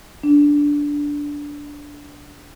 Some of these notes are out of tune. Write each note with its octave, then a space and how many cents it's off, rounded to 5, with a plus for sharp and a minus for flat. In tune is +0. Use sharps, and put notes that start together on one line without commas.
D4 -10